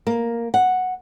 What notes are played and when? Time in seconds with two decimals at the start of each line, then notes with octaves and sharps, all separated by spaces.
0.07 A#3
0.54 F#5